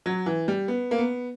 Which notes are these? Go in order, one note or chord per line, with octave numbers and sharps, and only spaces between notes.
F#3
E3
G3
B3
A#3
B3